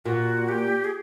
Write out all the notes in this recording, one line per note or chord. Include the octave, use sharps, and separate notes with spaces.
A#2 F#4
G4
G#4